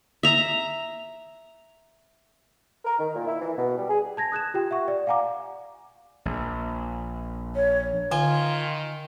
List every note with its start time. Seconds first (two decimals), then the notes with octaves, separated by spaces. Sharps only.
0.23 E5 A#5
2.85 A#4
2.99 D#3
3.16 A#2
3.27 E4
3.41 E3
3.57 B2
3.78 G3
3.89 G#4
4.17 A5 G#6 A#6
4.32 D#6 F#6 G#6 E7
4.54 F4 G4 G5
4.71 E5 F#5 C#6
4.88 D5
5.07 F5 F#5 G#5 A#5 D6
6.25 A#1
7.56 C#5
8.11 D3 D#3 F4 G#5